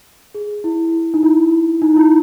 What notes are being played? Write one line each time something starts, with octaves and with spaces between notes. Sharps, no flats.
G#4
E4
D#4
E4
D#4
E4